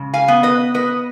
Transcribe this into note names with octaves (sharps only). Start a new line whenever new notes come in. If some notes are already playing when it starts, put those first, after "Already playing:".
Already playing: C#3 G#3
F5 G#5
B3
B4 D#5
B3 B4 D#5